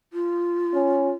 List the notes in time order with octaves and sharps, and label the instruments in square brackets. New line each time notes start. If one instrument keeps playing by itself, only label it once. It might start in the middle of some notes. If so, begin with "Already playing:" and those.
[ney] F4
[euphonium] C#4